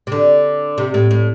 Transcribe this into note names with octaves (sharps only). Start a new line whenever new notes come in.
C3
D3
C3
A2
A2